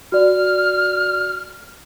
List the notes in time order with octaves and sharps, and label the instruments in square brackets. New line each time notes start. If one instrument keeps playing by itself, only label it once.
[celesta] F#4 D5 [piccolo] F6